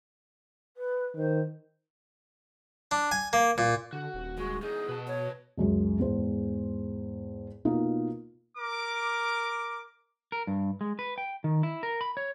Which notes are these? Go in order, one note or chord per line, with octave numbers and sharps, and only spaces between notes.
B4
D#3 C5
D4
G#5
A#3
A#2
D3 F#4
D#1
G#3 F#4
E2 D#4 G#4
B2 B4 A5
C#5
C#2 F#2 G#3
E2 G#2 C5
B2 A#3 D#4 F4
A#4 D6
A#4
G2
G#3
B4
G5
D#3
E4
A#4
B5
C#5